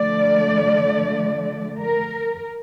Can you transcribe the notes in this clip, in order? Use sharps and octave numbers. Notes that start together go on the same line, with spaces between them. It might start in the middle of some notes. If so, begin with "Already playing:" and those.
Already playing: D3 F3 A3 D5
A#4